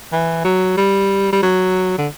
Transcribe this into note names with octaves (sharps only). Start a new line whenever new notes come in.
E3
F#3
G3
G3
F#3
D3